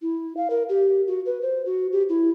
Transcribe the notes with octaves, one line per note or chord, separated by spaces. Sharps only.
E4
F5
A#4
G4
F#4
B4
C5
F#4
G4
E4